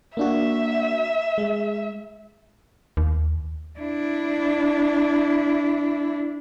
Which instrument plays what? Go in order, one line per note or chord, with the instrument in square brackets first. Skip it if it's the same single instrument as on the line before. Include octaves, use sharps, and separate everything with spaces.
[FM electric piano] A#3 D4 F#4 [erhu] E5
[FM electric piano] G#3
[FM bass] D#2
[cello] D4 E4